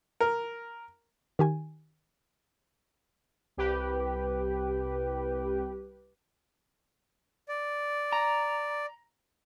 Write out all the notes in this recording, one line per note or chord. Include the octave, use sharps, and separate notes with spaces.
A#4
D#3 G4 G#5
C2 G4 B4
D5
A#5